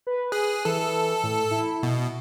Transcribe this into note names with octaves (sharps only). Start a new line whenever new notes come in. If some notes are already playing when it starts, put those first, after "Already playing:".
B4
G#4 F#6
E3 A4
A2
E4
B2